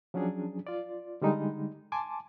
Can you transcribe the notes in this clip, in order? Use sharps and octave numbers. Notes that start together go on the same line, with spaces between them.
F3 F#3 C#4 D4 G#4
F4 D5
D3 G3 G#3 D#4
G#5 A5 C6 D6